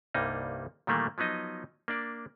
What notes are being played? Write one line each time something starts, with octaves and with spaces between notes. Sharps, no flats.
C2 G2 G3 A#3 D#4
A#2 D#3 E3 G3 A3 A#3
F3 F#3 B3 D#4 D#5
A#3 D4 D5